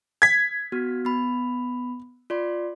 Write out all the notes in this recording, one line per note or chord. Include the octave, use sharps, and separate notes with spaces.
G#6 B6
B3 F#4 F6
B3 B5
F4 D5 C6